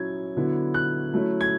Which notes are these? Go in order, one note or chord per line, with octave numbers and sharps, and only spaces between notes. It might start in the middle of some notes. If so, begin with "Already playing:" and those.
Already playing: F#3 C#4 E4 G#6
D3 F#3 B3 E4
F#6
F#3 A3 C#4 E4
G#6